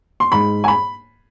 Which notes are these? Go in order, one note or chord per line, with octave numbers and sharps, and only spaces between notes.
C6
G#2 B5
G#5
B5